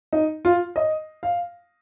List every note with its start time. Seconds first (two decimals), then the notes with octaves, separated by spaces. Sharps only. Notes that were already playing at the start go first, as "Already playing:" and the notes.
0.13 D#4
0.45 F4
0.76 D#5
1.23 F5